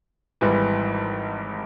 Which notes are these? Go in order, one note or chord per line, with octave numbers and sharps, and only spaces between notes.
G#1 G#2 E3 G3 B3